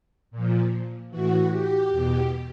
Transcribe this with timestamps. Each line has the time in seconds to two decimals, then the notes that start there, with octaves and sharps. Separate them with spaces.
0.31 A#2
0.37 F3
1.11 A2 E3 F#4
1.51 G4
1.90 E2 B2